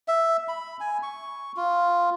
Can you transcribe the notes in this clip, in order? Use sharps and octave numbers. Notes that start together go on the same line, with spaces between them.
E5
B5
G#5
C#6
F4